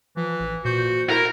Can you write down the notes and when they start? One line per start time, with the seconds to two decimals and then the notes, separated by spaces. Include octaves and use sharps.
0.17 E3 F3
0.40 A1
0.65 A#2 F#4 C5 G6
1.10 E4 A#4